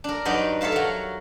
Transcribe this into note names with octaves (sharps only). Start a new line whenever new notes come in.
D4 A#4
G2 F#3 D#4 D5 D#5
A4 C#5 E5 F5 A5
F#3 A#4